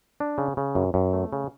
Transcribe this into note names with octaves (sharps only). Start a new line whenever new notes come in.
D4
C#3
C#3
F#2
F#2
A3
C#3